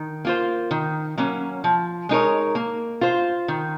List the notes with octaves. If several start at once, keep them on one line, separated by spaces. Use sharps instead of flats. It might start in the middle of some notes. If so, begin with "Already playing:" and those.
Already playing: D#3
A#3 F4 C5
D#3
F#3 A#3 C#4
F3
G#3 D#4 A#4 C#5
A#3
F4 C5
D#3